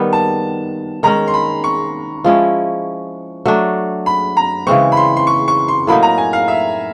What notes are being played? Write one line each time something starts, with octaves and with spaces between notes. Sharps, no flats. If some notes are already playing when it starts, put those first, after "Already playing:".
Already playing: D#3 G3 B3
A5
D#3 G#3 C#4 A#5
C6
B5
C#6
F3 G#3 C#4 E4
F#3 A3 D4
B5
A#5
C#3 E3 G#3 C4 C#6
B5
C6
C6
C#6
C#6
C6
A2 F#3 A#3 D#4 B5
A#5
G#5
F5
E5